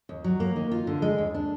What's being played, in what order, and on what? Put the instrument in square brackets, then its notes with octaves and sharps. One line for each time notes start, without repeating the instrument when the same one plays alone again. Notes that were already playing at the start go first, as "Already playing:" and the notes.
[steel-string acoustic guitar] D#2
F#3
A#3
D#3
F4
D3
G#3
D#2
D4